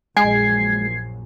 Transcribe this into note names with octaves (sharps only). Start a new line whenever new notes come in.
A#1 F#2 G#3 G#5 G#6 C7